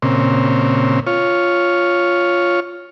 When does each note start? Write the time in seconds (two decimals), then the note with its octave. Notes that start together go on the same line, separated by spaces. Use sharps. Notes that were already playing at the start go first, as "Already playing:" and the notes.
0.02 A#2 C#3 C4
1.07 F4 C#5